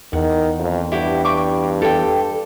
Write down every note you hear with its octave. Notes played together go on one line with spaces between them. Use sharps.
E2 D#3 F#5
F2
G2 E4 F#4 G4
G5 C#6 D6
G4 A4 G5